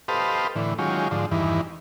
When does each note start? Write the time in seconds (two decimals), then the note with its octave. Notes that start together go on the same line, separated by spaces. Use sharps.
0.08 G4 A4 B4 C5 D#5 F5
0.56 A2 D3 E3
0.78 D#3 F#3 G#3 C#4 F4 G4
1.11 G#2 D3 F3
1.31 E2 G2 D#3 E3